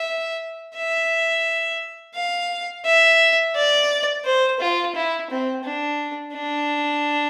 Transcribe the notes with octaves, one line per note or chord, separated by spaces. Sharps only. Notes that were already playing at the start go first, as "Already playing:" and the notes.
Already playing: E5
E5
F5
E5
D5
C5
F4
E4
C4
D4
D4